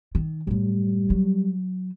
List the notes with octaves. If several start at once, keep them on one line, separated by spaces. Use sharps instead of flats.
D#3
F#2 A2 G3
F#3